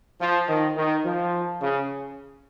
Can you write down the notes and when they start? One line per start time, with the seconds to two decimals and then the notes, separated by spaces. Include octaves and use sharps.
0.21 F3
0.49 D#3
0.77 D#3
1.05 F3
1.61 C#3